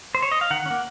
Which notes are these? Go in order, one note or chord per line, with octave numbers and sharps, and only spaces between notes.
C5
C#5
D#5
F5
D#3 F#5
C#4
A#3